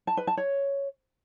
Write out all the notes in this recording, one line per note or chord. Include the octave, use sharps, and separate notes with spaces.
A5
B4
A5
C#5